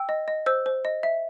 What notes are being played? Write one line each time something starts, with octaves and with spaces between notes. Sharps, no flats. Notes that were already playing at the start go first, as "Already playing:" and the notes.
Already playing: G5 E6
D#5
D#5
C5 E6
C5
D#5
E5